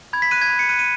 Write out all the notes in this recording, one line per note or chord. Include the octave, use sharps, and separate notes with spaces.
B5 G#6
B6
F#6 D#7
G#6
B5
C#7
F#6 D#7
D#7